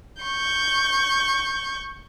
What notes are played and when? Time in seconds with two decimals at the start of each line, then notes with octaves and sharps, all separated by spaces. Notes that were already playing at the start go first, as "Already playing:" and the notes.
0.22 C#6 G6